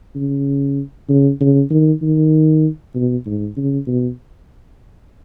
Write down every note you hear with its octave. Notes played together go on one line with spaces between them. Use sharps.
C#3
C#3
C#3
D#3
D#3
B2
G#2
C#3
B2